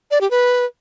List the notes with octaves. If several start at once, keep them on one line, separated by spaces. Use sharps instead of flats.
D5
G4
B4